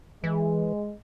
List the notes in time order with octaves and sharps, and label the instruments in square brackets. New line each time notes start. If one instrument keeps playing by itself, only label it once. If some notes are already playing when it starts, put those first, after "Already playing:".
[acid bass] E3 [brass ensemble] G#3